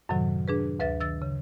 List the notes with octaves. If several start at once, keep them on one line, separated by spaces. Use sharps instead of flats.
F#2 A2 C3 D#3 F#3
D4 G#4 B4
D2 B4 E5 A6
D#3 E6 A6
C#3